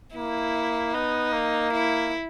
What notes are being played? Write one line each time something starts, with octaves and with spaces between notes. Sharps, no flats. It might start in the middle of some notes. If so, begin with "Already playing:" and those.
A#3 E4
B3 D#4
A#3
E4